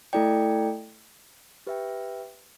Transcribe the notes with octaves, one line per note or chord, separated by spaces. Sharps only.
A3 E4 A4 D5 G5
G4 B4 E5 G5